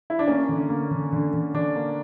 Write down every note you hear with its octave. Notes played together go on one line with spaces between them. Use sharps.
E4
D4
A#3 C#4
D3
A#3
D3
D3
D3
D3 D4
A#3